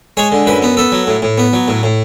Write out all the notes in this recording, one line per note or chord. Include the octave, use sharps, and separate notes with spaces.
G#3 C#5
D3
F#2 B4
B3
B3 A4
F#3
A2
A2
B3
F#3
A2
A2